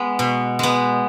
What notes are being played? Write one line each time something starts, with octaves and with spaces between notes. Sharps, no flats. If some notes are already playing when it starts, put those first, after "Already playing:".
Already playing: G#3 B3
B2
G#3 B3